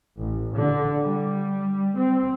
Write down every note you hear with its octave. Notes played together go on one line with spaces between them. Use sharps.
A1
D3
G3
C4